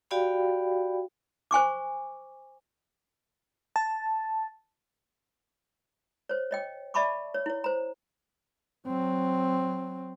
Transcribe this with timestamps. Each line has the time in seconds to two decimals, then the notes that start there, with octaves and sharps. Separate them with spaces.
0.11 F#4 G4 D5 F5 G5 B5
1.51 C5 G#5 C#6 D6
3.76 A5
6.29 C5 C#5
6.51 C#5 D#5 G5
6.94 D5 E5 A5 B5 C#6 D6
7.34 C#5
7.46 E4 C#5
7.64 C5 A#5
8.87 F#3 C4